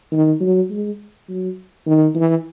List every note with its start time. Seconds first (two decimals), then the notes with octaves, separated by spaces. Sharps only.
0.12 D#3
0.40 F#3
0.70 G#3
1.29 F#3
1.86 D#3
2.15 E3